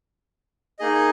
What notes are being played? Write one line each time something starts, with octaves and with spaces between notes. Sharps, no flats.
A#3 D#4 G#4 D#5